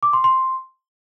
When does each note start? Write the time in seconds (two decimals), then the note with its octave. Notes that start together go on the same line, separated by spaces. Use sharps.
0.03 D6
0.13 C6
0.24 C6